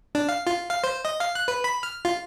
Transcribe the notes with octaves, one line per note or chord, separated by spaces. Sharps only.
D4
F5
F4
F5
C5
D#5
F5
F#6
B4
B5
F6
F4